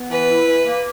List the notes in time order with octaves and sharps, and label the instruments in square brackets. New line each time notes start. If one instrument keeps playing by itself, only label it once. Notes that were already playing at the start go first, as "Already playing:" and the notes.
Already playing: [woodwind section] B3
[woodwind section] E3 [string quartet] B4
[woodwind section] E4
E3
A#3